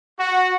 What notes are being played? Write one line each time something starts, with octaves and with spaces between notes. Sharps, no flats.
F#4